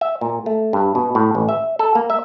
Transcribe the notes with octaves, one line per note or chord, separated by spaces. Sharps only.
E5
A#2
A3
G2
B2
A2
A1
E5
A4
A#3
E5